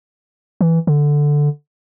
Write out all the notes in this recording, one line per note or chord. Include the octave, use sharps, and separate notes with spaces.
E3
D3